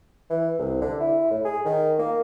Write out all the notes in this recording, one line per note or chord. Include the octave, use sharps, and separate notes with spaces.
E3
C2
D3
E4
A2
G#4
D#3
A#3